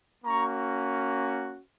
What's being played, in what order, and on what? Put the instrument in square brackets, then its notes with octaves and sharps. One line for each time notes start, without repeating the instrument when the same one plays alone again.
[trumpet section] A#3 C#4 F#4 A#5 C#6